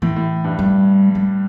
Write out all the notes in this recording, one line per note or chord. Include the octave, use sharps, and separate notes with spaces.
A2 E3
A2
G2
G3
G3